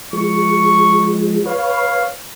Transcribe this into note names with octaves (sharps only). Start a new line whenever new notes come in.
F3 G#3 C#6
B4 C#5 F5